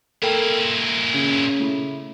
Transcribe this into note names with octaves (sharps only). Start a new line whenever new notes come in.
A#2 E4 A4 A#4 G5
A#6
C#3 G#6
A3 E4